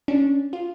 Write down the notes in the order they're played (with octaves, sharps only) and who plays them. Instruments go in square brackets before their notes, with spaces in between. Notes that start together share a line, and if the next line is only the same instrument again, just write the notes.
[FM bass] C#4 [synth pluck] D4
[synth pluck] F4